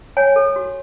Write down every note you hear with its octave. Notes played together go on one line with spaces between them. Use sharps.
C#5 G#5
A4
F#4